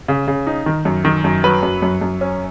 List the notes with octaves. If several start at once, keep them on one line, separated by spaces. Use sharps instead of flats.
C#3
C#3
D#4
D#3
F#2
D#3
F#2
F#3 B4
F#2
F#2
F#2
C#4